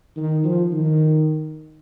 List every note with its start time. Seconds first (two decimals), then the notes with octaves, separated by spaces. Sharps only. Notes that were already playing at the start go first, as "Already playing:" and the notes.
0.16 D#3
0.44 F3
0.72 D#3